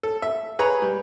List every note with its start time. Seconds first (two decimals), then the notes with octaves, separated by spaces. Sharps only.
0.03 A4
0.22 E5
0.59 G#4 B4 C#5 A#5 B5
0.82 G3